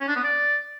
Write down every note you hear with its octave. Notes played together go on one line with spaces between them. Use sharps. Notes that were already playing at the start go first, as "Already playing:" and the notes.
C#4
D4
B3
D5